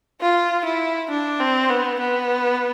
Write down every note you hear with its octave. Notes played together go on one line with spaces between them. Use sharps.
F4
E4
D4
C4
B3
B3